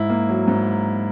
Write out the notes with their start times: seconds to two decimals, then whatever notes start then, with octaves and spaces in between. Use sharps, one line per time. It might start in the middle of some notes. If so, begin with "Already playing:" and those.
Already playing: G#2 E4
0.10 A#3
0.29 F#3
0.48 G#2